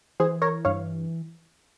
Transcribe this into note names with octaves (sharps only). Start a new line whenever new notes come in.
E3 G#4 C5
A#4 C#5
G2 C#5 F5